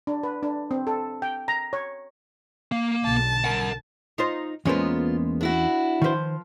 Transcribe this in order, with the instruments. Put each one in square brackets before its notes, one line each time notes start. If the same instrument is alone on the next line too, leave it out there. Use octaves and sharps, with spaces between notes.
[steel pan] D4
B4
D4
C4
A4
G5
A#5
C#5
[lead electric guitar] A#3
[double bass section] B1 B2 D3 [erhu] A5
[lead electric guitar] A#4 F#5
[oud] D#4 F4 C5
[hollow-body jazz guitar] E2 C#4 C5 [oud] G#3 A#3 B3 [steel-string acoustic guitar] F4
[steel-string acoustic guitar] D4 E4 F#4
[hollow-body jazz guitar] D#3 C5 [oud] F3 B4